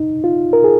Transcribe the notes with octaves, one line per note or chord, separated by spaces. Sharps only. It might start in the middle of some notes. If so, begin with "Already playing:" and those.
Already playing: D#4
F4
A#4
G#4